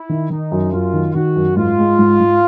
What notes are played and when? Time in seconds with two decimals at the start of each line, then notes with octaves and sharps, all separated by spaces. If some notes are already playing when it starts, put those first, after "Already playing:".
Already playing: E4
0.09 D#3
0.30 D#3 D#4
0.52 F#2
0.72 F#2 F4
0.93 D#3
1.14 D#3 F#4
1.36 F#2
1.56 G#2 F4
1.78 G#3
1.99 G#2
2.20 G#2